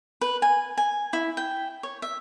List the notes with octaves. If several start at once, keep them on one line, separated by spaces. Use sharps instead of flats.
B4
G#5
G#5
E4
G5
C#5
E5